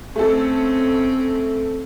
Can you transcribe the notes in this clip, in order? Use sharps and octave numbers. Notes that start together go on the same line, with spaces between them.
A3 C4 C#4 A4